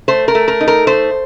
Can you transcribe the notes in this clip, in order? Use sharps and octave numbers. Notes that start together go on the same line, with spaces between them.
A3 C5
A#4
A3
A#4
D#4
A#4
A3 C5